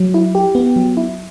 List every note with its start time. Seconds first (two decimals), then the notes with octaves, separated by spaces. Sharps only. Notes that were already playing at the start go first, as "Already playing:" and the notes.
Already playing: F#3
0.14 E4
0.35 G4
0.55 B3
0.76 F#3
0.97 E4